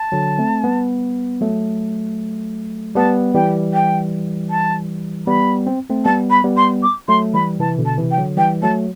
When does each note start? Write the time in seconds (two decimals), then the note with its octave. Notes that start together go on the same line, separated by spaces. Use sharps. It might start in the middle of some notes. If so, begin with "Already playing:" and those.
Already playing: A5
0.12 D3 F#3
0.38 A3 C4
0.64 G3 B3
1.41 F#3 A3
2.95 G3 B3 A5
3.34 E3 G3 G5
3.74 G5
4.50 A5
5.27 G3 B3 B5
5.67 C4
5.90 A3 C4
6.05 G3 B3 A5
6.30 B5
6.44 G3 B3
6.57 C6
6.83 D6
7.08 F#3 A3 C6
7.34 E3 G3 B5
7.59 C3 E3 A5
7.78 B2 D3
7.85 A5
7.98 C3 E3
8.11 G5
8.18 D3 F#3
8.37 E3 G3 G5
8.62 F#3 A3 A5